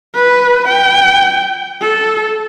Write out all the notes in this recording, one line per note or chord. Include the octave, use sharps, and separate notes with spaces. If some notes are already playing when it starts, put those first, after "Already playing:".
B4
G5
A4